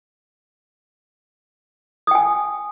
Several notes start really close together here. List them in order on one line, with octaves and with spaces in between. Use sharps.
D#6 G5 G#5